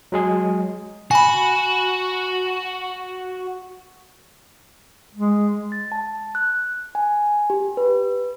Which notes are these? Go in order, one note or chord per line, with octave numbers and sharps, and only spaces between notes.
F#3 G#3 G#4
F#4 G#5 B5
G#3
A6
A5
F#6
G#5
G4
B4